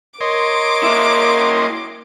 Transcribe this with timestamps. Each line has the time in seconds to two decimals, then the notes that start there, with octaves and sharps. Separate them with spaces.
0.21 A#4 C#5 D#5 C6 D6
0.83 A#3 E4